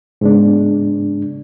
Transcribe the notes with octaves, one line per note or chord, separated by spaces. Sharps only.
G#2 C#3 G#3 B3 D4